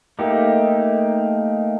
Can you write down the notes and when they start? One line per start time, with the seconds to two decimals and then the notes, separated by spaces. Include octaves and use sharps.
0.19 A3 A#3 D#4 G4